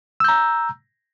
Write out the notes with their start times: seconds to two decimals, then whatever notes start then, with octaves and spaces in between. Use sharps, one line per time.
0.20 E6
0.24 G6
0.28 A#5